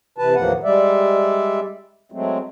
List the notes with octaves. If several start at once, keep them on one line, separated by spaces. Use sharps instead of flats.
C3 E3 B4 A5
D#2 A2 E3 F3 A#3 F#5
G3 G#3 D5 E5
F#3 G#3 A3 C4